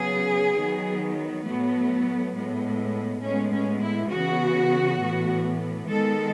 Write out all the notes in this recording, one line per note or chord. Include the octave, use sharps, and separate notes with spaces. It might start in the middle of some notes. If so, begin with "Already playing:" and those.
Already playing: C#3 F#3 B3 G#4
D#3 F#3 B3
A2 F#3 A3 B3
A2 G#3 B3
A2 G#3 B3 C#4
C#4
E4
C#3 E3 B3 F#4
A2 E3 B3
D#3 G#3 B3 A4